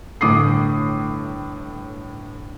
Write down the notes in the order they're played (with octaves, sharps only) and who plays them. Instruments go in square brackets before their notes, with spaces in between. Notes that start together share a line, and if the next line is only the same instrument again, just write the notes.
[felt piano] G1 A2 D6 D#6 C7